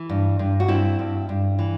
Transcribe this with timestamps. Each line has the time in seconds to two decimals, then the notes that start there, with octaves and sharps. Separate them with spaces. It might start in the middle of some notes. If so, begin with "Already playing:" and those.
Already playing: E3
0.09 G2
0.39 G2
0.60 F#4
0.68 G2 C4 E4
0.99 G2
1.29 G2
1.59 E3